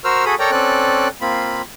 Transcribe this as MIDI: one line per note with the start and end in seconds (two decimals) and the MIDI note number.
0.04 0.25 66
0.04 0.25 70
0.04 0.25 72
0.04 0.25 88
0.04 0.25 89
0.26 0.35 66
0.26 0.35 68
0.26 0.35 69
0.26 0.35 83
0.26 0.35 87
0.39 0.51 69
0.39 0.51 70
0.39 0.51 73
0.39 0.51 74
0.39 0.51 79
0.39 0.51 82
0.52 1.08 60
0.52 1.08 61
0.52 1.08 69
0.52 1.08 74
0.52 1.08 90
1.21 1.62 58
1.21 1.62 60
1.21 1.62 65
1.21 1.62 83